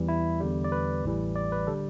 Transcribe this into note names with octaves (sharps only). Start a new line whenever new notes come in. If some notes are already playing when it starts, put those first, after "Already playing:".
Already playing: E2 E3 G3
E4
E2 D3 G3
D5
B4
A1 A2 E3 G3
D5
B4
D3 G3 A4